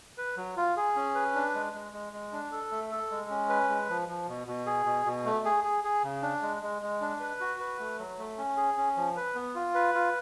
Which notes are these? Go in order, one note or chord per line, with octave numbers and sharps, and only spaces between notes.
B4
F#3
F4
G#4
C#4
B4
D4
G#3
G#3
G#3
G#3
D4
A4
A3
A4
G#3
C#4
B4
G#3
F3
F3
B2
B2
G#4
B2
B2
A3
G#4
G#4
G#4
C#3
D4
G#3
G#3
G#3
D4
B4
F#4
B4
A3
F#3
A3
C#4
G#4
C#4
F3
B4
B3
F4
B4
F4